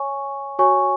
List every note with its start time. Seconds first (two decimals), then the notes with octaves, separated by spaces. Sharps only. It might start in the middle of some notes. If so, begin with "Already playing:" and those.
Already playing: C#5 G#5 C#6
0.59 F#4 C#5 G#5 C#6